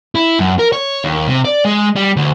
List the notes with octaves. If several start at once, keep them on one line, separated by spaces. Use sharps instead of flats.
E4
F#2
A#4
C#5
D#2
C3
D5
G#3
G3
D2